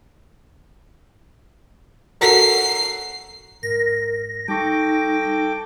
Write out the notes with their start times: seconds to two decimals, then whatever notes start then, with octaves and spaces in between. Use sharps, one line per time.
2.21 F#4 A4 A#4 C7
3.63 G#2 A#4 A#6
4.48 G3 D#4 A4 G5 C#6 D6